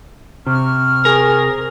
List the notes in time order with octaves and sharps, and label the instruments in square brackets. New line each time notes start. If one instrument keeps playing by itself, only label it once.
[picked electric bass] C3 [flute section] C#6 F6
[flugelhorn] G#4 [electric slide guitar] A#4